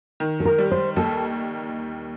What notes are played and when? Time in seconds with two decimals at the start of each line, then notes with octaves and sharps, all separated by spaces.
0.20 D#3
0.40 A4
0.45 A#4
0.58 G3
0.71 C5
0.96 D#2 A4